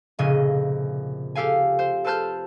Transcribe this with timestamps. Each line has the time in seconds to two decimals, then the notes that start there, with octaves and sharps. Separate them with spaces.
0.19 F1 A#2 C#3 D#5 G#5 D#7
1.35 G4 A4 F5 G#5
1.79 C5
2.04 A4 B4 C5 A5 F6 G6